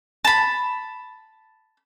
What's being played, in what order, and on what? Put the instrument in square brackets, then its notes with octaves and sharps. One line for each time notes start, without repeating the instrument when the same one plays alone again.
[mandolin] A5 B5